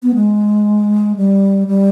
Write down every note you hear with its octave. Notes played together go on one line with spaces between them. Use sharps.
B3
G#3
G3
G3